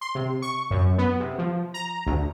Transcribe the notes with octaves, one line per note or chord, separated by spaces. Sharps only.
C6
C3
C#6
F#2
B3
C3
F3
A#5
D2